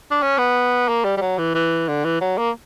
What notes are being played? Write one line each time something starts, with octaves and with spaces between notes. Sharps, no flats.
D4
C#4
B3
A#3
G3
G3
F#3
E3
E3
D3
E3
F#3
A#3